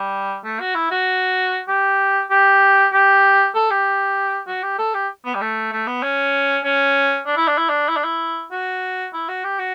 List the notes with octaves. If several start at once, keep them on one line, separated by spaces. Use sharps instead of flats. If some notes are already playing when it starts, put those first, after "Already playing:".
Already playing: G3
A3
F#4
E4
F#4
G4
G4
G4
A4
G4
F#4
G4
A4
G4
B3
G3
A3
A3
B3
C#4
C#4
D4
E4
D4
E4
D4
E4
D4
E4
F#4
E4
F#4
G4
F#4